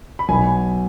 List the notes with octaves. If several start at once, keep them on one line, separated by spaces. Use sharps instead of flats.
B5
B1 B2 G#5